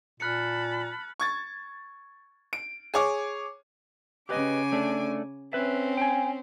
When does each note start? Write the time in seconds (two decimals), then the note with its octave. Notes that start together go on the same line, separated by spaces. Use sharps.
0.20 A#2 A5 B5 F6 F#6 C#7
1.20 C#6 G#6 A6
2.53 D7
2.94 G#4 C#5 D6
4.29 C#3 G4 B4 D#5 G#5 D6
4.72 A3 D4
5.53 C4 C#4 B4 E5
5.97 G5 G#5